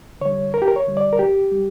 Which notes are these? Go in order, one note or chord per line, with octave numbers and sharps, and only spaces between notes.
D3 G3 C#5
D2 A#4
G4
A#4
C#5
D3 G3
D5
A#4
D2 G4
G3